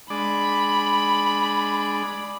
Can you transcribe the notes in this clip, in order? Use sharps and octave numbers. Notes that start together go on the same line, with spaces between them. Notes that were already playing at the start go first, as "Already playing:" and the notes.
G#3 D4 D5 B5